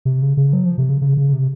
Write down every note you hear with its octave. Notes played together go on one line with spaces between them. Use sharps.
C3
C#3
C#3
F#3
F3
C3
C#3
C#3
C#3
C3